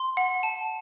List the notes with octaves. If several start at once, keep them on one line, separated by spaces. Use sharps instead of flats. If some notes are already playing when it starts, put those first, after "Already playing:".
Already playing: C6
F#5
A5